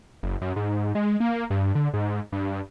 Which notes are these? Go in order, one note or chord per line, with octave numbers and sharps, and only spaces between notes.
F#1
F#2
G#2
G#3
A#3
G2
D3
G#2
G2